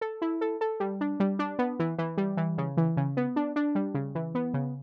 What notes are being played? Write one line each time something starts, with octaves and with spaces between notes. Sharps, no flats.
A4
E4
A4
A4
G3
D4
G3
D4
B3
E3
E3
G3
E3
C#3
E3
C#3
B3
D4
D4
G3
C#3
E3
B3
C#3